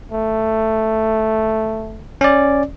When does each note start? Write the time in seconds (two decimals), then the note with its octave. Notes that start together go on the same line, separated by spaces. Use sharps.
0.12 A3
2.21 C#4 D5